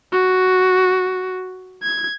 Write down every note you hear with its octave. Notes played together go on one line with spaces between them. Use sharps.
F#4
G#6